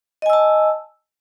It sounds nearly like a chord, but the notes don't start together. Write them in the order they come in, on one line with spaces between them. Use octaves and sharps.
D#5 G#5 E6 A5